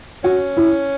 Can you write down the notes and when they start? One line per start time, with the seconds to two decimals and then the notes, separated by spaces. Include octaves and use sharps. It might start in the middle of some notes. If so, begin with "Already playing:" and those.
0.24 C#4 F#4
0.57 E4